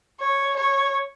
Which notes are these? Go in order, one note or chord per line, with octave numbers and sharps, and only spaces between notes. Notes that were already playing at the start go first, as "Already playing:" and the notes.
C#5
C#5